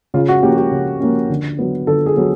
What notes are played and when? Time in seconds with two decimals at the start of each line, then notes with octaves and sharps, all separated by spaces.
0.14 C#3 F4
0.29 F#4
0.43 F3 A#3 C#4 G4
0.57 G4
0.72 C#3
1.00 F3 A#3 C#4
1.30 D3
1.59 F#3 B3
1.87 D3 A4
2.06 G#4
2.17 F#3 B3